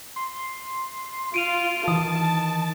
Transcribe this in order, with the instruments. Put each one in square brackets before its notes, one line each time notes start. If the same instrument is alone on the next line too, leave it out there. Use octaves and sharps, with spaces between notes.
[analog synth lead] C6
[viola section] F4 [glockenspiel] D7 D#7 F7
[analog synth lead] D#3 [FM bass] E3 [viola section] A5 [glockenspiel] D#6